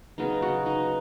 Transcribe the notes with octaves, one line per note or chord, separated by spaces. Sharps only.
C#3 F#3 B3 D#4
F#4
D#4